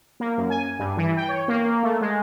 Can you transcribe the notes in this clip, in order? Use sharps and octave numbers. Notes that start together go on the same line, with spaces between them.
A#3
F#2
G#5
G2
E3
G5
C#5
A#3
A3
G#3